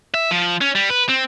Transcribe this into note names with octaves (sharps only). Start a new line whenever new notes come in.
E5
F3
C#4
G3
B4
C4